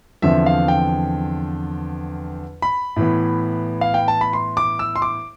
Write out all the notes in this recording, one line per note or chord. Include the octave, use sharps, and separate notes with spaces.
E2 D3 F3 C4 E5
F5
G5
B5
A2 E3 B3
F5
G5
A5
B5
C6
D6
E6
C6
D6